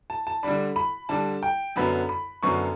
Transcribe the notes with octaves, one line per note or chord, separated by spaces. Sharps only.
A5
A5
D3 G3 D4 B5
B5
D3 G3 D4 A5
G5
F#2 D3 F#3 B3 B5
B5
F#2 D3 F#3 B3 C#6